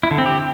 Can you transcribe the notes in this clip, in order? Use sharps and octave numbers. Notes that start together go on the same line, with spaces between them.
E4
D3
C4
G4